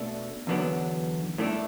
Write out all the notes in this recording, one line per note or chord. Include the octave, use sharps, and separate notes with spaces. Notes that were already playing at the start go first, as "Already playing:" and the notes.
Already playing: B2 A3 D4
E2 D3 F#3 B3 D4
A2 A3 D4